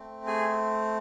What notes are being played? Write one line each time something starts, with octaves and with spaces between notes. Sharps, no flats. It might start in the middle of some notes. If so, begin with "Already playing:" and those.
Already playing: A3 C4
G#4 G#5